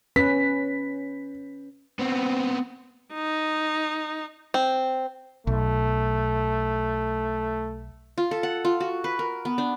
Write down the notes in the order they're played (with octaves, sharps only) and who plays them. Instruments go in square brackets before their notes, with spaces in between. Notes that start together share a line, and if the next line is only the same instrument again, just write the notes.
[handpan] C#4 B4 [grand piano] B6
[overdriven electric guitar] B3 C4
[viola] D#4
[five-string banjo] C4
[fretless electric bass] B1 [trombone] A3
[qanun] F4
A4
F#5
F4
F#4
B4
A#4
B3
D4